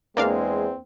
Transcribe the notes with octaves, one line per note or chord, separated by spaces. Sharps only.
E2 G#3 A#3 C4 D4 F5